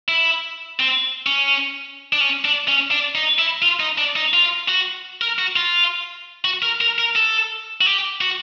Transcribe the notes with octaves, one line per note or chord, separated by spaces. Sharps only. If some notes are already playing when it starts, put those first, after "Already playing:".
E4
C4
C#4
D4
C#4
D4
C#4
D4
D#4
E4
F4
D#4
D4
D#4
F4
F#4
A#4
F#4
F4
F#4
A#4
A#4
A#4
A4
F#4
G4
F#4